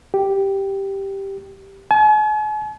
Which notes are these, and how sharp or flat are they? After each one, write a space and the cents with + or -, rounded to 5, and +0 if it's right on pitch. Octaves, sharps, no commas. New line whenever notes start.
G4 +0
G#5 +45